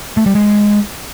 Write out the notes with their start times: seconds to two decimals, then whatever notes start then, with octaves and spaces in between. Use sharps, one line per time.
0.17 A3
0.26 G3
0.35 G#3